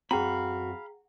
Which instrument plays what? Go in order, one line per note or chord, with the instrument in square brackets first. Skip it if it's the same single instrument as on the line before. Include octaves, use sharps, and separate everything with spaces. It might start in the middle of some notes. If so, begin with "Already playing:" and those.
[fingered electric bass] F#2 C4 [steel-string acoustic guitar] F#4 [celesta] G#4 G5 A#5 [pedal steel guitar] F5 B5